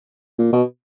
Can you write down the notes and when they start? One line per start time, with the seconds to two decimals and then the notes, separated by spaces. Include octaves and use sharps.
0.39 A#2
0.53 B2